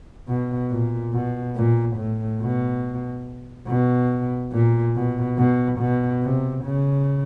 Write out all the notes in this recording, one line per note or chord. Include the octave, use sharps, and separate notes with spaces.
B2
A#2
B2
A#2
A2
B2
B2
A#2
B2
B2
B2
C3
C#3